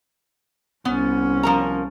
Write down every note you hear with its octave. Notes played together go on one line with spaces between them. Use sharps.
C2 B3 C#4
F3 A#4 A#5